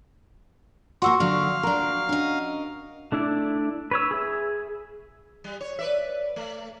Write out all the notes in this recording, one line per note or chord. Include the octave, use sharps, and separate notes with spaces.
A#3 F4 F#4 F#5 C6 E6
D3 F#3 D4 F5
A#3 D4 A#4
C#4 D4 D#5
A3 D4 E4 D5
B4 C#5 E6
G#4 E5
G3
C#5
B4 D5 E5
A3